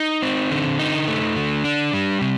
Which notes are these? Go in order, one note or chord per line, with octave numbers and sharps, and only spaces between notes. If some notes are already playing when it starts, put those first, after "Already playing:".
Already playing: D#4
C4
D3
D#4
A3
D3
D4
G3
C3